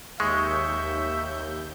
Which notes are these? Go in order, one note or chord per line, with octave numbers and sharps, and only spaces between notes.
D#2 G#3 E5 C#6 G6